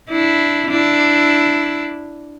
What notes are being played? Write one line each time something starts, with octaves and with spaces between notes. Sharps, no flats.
D4 E4
D4 E4